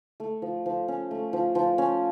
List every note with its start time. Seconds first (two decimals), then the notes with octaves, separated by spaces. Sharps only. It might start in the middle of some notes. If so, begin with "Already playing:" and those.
0.20 A3
0.42 F3
0.66 F3
0.88 C#4
1.11 A3
1.33 F3
1.55 F3
1.78 C#4